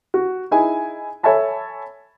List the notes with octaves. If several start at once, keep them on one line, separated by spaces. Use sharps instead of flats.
F#4
D#4 E4 G#4 G#5
A4 C#5 E5 G#5 A5 B5